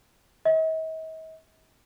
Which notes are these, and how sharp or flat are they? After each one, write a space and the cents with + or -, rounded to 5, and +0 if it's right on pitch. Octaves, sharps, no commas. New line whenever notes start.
D#5 +45